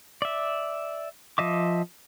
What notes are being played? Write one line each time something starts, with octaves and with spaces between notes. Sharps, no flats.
D5 E5
F3 D#5 E5 D6